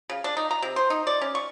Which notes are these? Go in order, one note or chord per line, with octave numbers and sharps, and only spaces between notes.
C#3
D4
D#4
A#5
C3
C5
D#4
D5
C#4
C#6